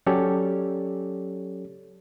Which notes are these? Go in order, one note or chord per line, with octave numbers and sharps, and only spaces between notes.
F#3 C#4 G4 A4 C#5 D5